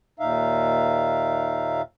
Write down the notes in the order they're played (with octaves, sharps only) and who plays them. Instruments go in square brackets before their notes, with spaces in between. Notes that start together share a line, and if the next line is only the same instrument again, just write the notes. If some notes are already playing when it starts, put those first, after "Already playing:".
[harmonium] D#2 A#2 D#4 E5 F5